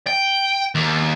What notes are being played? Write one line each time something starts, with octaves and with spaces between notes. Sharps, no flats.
G5
D#2